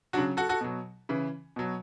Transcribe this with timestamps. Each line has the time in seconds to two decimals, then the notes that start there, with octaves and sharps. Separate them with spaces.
0.13 C#3 F#3 D4 F#4
0.37 F#4 A4
0.49 F#4 A4
0.61 B2 F#3
1.09 C#3 E3
1.56 B2 F#3